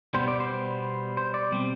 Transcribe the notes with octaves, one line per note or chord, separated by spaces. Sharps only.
B2 G3 B3 C5
D5
C5
C5
D5
B2 G3 C4